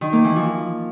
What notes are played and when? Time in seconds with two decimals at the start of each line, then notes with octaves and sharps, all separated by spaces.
0.01 D#3
0.13 A#3
0.24 E3
0.36 F3